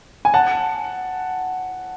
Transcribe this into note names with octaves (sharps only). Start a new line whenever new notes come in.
G#5
F#5 A5